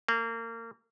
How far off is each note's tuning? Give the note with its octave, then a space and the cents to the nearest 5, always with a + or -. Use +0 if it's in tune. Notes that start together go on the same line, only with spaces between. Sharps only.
A#3 -30